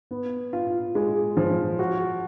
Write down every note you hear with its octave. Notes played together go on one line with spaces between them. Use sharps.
B3
F4
G#3
F3
F#4